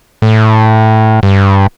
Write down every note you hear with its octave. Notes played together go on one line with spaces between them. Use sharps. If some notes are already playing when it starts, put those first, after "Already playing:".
A2
G2